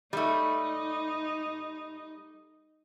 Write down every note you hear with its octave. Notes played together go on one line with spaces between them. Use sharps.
G3 A3 D#4